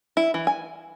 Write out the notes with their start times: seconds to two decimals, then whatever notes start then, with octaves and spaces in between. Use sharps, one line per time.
0.17 E4
0.34 E3
0.47 G#5